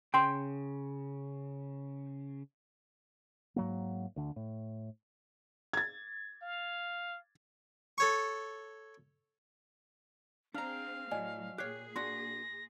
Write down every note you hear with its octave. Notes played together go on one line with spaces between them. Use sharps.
C#3 G5 C6
G#2 F#3 A#3
D2 D3
A2
G#6 A6
F5
A4 C#5 C#6
C4 D4 G#4 F5 A#5
A2 F#3 D5 D#5 G#5
A#2 G4 G#4 C#5 F#6 C7
A#3 D4 F#4 C6 A#6